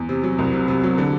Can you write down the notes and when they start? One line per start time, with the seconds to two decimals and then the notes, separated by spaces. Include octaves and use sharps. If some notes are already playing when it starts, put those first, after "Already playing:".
Already playing: E2
0.09 C3
0.23 F#3
0.38 C2
0.53 C3
0.68 C3
0.83 F#3
0.98 D3